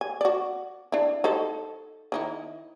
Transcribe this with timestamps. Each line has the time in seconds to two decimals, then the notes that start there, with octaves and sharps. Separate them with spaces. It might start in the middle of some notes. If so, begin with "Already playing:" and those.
0.01 G#5
0.21 F#4 D5
0.92 D4 E4
1.24 D#4 A4 C5
2.12 D#3 D#4 E4